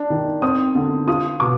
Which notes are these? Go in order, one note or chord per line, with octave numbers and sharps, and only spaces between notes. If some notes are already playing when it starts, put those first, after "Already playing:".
Already playing: D4
D#3
C4 D#6
D3
F4 D#6
B2 D6